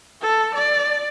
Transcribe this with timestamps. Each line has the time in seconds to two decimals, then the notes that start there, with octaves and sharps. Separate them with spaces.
0.22 A4
0.55 D5